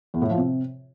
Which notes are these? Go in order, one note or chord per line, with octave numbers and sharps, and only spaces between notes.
E2
A2
F3
C3